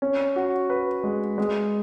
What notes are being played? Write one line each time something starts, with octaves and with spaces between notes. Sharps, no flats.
C#4
F#4
B4
G#3
G#3